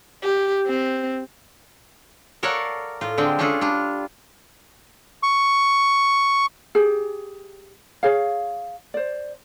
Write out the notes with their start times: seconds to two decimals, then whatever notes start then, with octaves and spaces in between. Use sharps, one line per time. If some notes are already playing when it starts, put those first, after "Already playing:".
0.23 G4
0.66 C4
2.43 A4 A#4 C#5 D5 F5 F#5
3.01 A2 F4
3.18 D3 G#3 C4 G5
3.39 C#4 D4 F4 G#4 A4
3.61 G3 D4 F4
5.23 C#6
6.75 G4 G#4
8.03 G#4 C#5 F5
8.94 C5 D5